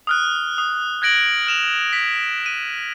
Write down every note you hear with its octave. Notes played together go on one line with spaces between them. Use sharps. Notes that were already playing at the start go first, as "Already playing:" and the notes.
D#6 F6 F#6
D#6
F#6 G#6 A#6 D7 F#7
F6 E7 F7
B6
D#7